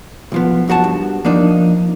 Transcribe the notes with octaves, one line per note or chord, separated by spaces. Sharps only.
B1 F3 B3
C2 F#2 F#4 G#4 A5
G2
F3 A#3 D4 D#4